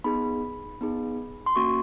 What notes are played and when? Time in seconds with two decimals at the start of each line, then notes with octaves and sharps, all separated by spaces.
0.04 B3 D#4 G#4 B5
0.81 B3 D#4 G#4
1.46 C6
1.56 A#3 C#4 F#4 C#6